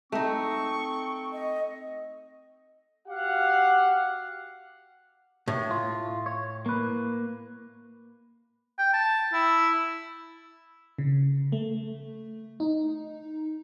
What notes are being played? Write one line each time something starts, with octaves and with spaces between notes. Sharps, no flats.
A3 C4 D#4 C#6
D#5
F#4 G4 F5 F#5
A2
F4
C#5
A#3 B4
G5
A5
E4
C#3
A3
D#4